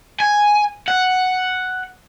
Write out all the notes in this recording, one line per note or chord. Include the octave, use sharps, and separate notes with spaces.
G#5
F#5